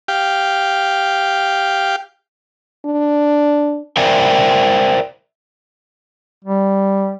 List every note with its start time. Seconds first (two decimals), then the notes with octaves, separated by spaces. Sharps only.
0.08 G4 F5 G5
2.85 D4
3.97 A#4 C5 D5 E5 G5 G#5
6.45 G3